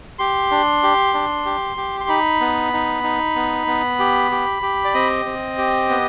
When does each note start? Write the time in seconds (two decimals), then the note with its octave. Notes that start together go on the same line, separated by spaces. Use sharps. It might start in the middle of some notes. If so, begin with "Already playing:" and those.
0.19 G4 C6
0.51 D4
0.83 G4
1.14 D4
1.46 G4
1.77 G4
2.00 C6
2.09 D#4 B5
2.41 B3
2.73 D#4
3.04 D#4
3.36 B3
3.67 B3
3.99 G4
4.31 G4
4.62 G4
4.84 D5
4.94 C4 D#5
5.25 C4
5.58 G4
5.89 B3